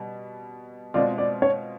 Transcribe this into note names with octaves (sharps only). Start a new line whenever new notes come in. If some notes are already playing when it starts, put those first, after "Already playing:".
Already playing: B2 G3
B2 G#3 C4 F4 D5
D5
C#5